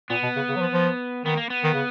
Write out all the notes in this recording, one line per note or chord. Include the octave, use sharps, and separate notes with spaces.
A#2 B3
B2
C#3
C#3
F#3
F3
F3
D#3 B3
A#3
B3
D#3
C#3